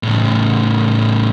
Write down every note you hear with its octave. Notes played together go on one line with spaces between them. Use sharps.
A2 C#3